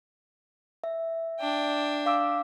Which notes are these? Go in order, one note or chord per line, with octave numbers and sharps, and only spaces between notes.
E5
D4 G5
F5 D6 E6